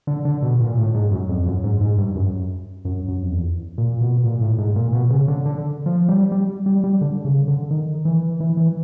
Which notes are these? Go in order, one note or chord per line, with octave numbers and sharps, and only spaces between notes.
D3
D3
B2
A#2
A2
G#2
F#2
F2
F#2
G#2
G#2
G2
F#2
F#2
F#2
F2
E2
A#2
B2
A#2
A2
G#2
A#2
B2
C#3
D3
D3
F3
G3
G3
G3
G3
D3
C#3
D3
D#3
E3
E3
E3